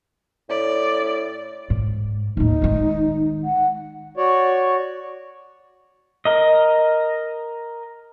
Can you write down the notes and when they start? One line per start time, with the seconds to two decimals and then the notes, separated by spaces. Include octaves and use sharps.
0.49 A2 D5
1.70 G#2
2.37 D#2 A2 D#4
2.62 D#3 G#3
3.44 F#5
4.17 F#4 C#5 D5
6.25 A#4 D#5